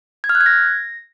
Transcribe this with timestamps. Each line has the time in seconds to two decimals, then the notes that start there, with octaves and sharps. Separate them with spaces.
0.24 G#6
0.29 F6
0.35 F#6
0.41 G#6
0.46 A#6